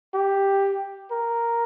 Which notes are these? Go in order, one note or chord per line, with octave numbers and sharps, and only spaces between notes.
G4
A#4